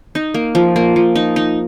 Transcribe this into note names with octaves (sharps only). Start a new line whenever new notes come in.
D#4
A#3
F3
A#3
F3
D#4
D#4